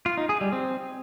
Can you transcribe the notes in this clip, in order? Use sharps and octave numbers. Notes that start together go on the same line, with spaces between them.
F4
D#4
G#4
G3
C4